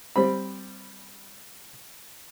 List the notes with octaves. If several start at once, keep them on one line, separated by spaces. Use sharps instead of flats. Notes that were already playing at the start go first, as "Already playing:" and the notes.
G3 C4 B5